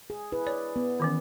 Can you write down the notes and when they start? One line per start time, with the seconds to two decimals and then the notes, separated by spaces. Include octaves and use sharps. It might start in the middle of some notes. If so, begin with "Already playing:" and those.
0.10 G#4
0.32 E4 G#4 B4
0.47 C#5 D5
0.76 B3
1.00 D#3 E3 C#4